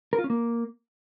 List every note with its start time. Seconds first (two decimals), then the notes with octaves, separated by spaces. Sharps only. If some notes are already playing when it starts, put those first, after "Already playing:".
0.13 A#4
0.18 F4
0.24 C#4
0.30 A#3